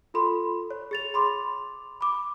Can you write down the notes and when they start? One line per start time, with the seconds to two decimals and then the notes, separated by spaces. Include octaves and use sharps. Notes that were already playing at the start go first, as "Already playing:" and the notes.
0.14 F4 A4 B5 C6
0.70 C#5
0.91 G#4 A6 F7
1.14 B5 C6 D6
2.01 B5 D6